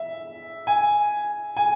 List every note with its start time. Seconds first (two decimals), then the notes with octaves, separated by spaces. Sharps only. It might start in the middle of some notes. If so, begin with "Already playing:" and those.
Already playing: E5
0.67 G#5
1.57 G#5